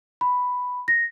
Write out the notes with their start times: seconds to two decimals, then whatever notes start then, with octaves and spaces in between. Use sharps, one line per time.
0.21 B5
0.88 A#6